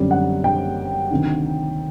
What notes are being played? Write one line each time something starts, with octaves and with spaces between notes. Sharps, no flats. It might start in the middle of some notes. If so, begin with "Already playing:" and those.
Already playing: F#2 D3 G3 C4
F#5
G5
D2 C3 D#3